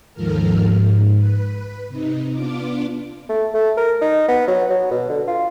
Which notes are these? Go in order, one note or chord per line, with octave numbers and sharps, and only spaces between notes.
D#2 G#2 F3 A4 A#4 F6
G#2
B4
C3 D#4
B3 D4 F4 D6
A3
A3
A#4
D#4
B3
F#3
F#3
B2
D3
F4